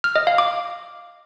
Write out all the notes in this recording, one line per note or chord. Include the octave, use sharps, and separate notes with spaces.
F6
D#5
F5
D6